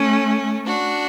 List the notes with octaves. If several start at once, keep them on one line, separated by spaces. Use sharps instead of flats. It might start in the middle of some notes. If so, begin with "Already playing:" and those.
Already playing: A3 C#4
D4 F#4